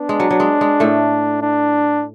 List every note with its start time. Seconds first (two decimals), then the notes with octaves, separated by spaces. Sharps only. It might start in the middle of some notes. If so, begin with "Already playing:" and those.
Already playing: B3 D4
0.09 G#3
0.20 F#3
0.31 F#3
0.40 G#3
0.61 G#3
0.80 A2 A3
1.42 D4